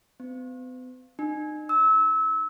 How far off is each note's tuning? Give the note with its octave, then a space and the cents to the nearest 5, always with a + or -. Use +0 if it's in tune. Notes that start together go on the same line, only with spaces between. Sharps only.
B3 +45
D#4 -35
E6 -25